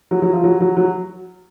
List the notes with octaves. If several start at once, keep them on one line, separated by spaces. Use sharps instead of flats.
F#3
F#3
F3
F#3
F#3
F#3